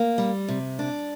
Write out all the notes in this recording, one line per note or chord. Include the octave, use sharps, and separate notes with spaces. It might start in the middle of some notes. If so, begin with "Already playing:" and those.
Already playing: A#3
G3
C3
D4